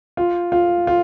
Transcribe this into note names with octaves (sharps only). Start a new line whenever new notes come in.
F4
F4
F4